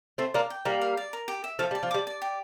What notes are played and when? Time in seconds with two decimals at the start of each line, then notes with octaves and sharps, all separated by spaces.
0.18 A3 C4 C5
0.34 A#3 D4 D6
0.50 G5
0.65 G3 A#3 A#4
0.81 F5
0.97 D5
1.13 A#4
1.28 G4
1.44 E5
1.59 F3 A3 A5
1.71 G3
1.75 D5
1.83 F3
1.91 G3 D6
2.07 D5
2.22 G4